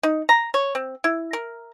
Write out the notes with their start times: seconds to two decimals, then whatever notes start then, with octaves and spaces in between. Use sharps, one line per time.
0.03 D#4
0.29 A#5
0.54 C#5
0.75 C4
1.04 E4
1.33 A#4